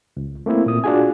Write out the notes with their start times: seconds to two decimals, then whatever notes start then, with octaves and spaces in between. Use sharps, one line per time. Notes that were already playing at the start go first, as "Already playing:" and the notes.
0.17 C#2
0.46 A3 A#3 C4 E4
0.66 A#2 D#6
0.84 D4 F4 F#4 G#4 G#5